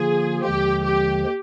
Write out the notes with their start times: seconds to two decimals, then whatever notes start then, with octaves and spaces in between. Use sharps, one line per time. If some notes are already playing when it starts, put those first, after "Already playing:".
Already playing: D3 F3 A#3 F4 G#4
0.44 D#2 D3 F3 G#3 G4
0.85 G4